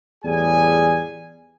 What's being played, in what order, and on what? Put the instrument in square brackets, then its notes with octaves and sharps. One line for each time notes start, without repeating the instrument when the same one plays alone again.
[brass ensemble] E2 A2 G3 G#4 G#5